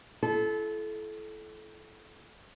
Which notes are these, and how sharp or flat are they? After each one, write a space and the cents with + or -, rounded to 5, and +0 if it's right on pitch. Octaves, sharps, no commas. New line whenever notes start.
E4 +35 A4 -25